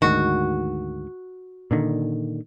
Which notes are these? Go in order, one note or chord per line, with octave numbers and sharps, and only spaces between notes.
D2 G#2 D#3 F#4
A#2 D3 D#3